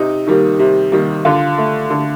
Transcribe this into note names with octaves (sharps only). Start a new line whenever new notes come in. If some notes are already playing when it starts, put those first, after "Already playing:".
Already playing: C3 D#4
D#3 G3 A#3
C3
D#3 G3 A#3
D3 F4
A3
D3